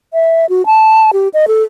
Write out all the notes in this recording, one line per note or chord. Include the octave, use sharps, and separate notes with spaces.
E5
F#4
A5
G4
D#5
A4